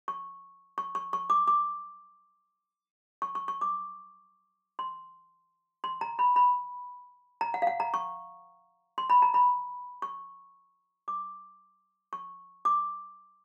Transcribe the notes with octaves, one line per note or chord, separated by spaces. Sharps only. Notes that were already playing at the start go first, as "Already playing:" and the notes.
C#6
C#6
C#6
C#6
D6
D6
C#6
C#6
C#6
D6
C6
C6
A#5
B5
B5
A#5
F#5
F5
F#5
A#5
C#6
C6
B5
A#5
B5
C#6
D6
C#6
D6